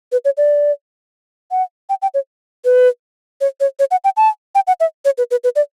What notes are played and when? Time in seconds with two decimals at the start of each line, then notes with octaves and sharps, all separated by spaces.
0.12 B4
0.25 C#5
0.37 D5
1.51 F#5
1.89 G5
2.02 G5
2.14 C#5
2.65 B4
3.41 C#5
3.60 C#5
3.79 C#5
3.91 F#5
4.04 G5
4.17 A5
4.55 G5
4.67 F#5
4.80 E5
5.05 C#5
5.18 B4
5.31 B4
5.44 B4
5.56 D5